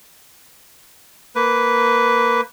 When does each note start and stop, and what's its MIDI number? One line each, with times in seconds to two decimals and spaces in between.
1.35 2.41 58
1.35 2.41 71